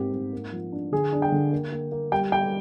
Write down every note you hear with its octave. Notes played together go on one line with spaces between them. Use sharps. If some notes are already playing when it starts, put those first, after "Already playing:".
Already playing: G#2 A#3 C4 G4
G#2
A#3
F3
D4
D3 G#4
D4
G5
D3
A#3
A#3
A#3
G3 G5
G3 G5